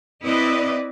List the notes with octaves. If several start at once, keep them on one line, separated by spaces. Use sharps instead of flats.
C4 E4 B4 D5 D#5